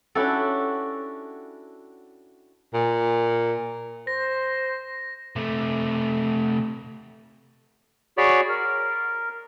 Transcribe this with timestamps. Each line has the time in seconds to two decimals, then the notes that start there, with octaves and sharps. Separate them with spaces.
0.15 C#4 D4 E4 F#4 G4 A4
2.74 A#2
4.07 C5 A#6
5.36 C3 A3
8.18 F#4 G#4 C#5 D5 B5
8.49 A#4